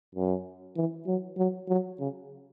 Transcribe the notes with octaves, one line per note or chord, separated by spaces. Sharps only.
F#2
E3
F#3
F#3
F#3
C#3